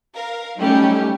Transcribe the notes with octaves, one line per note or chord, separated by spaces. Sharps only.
A#4 F5
F#3 G3 A3 C#4 D#4 G4